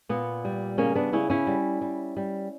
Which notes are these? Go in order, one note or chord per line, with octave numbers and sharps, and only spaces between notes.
A#2 B3
G3
C#3 A#3 C#4
B3 D4
C#3 C#4 E4
C#4 E4
G3
G3
G3